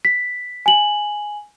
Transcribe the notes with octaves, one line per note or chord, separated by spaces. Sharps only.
B6
G#5 F#7